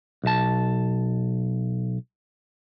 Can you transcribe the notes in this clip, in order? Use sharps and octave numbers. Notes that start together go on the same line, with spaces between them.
B1 A5